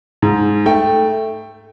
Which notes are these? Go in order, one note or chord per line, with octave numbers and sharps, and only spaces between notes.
G#2
A3 G5